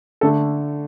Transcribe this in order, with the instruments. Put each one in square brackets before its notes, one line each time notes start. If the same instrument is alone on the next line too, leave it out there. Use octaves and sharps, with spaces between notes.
[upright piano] D3 A3 A4